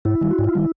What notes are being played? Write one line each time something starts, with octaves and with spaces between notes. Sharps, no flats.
G#2 E4
D#3 G3
F#4
G#2
F4
D#3 G3 E4